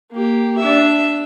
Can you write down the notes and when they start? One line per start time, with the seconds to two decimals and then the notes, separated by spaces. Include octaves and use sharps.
0.12 A#3 G4
0.58 D4 E5